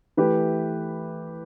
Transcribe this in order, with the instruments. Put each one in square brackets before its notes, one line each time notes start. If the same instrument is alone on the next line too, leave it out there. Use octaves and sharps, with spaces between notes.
[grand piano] E3 A3 G4 B4